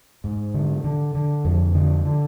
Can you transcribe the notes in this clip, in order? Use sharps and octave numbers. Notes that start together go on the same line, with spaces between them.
G#2
D3
D3
D3
F2 F3
D3
D3